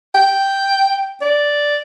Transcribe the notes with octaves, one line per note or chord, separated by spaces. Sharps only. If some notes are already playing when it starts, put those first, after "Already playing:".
G5
D5